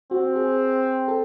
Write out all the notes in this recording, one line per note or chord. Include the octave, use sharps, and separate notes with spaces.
C4 F#4
G#4
A4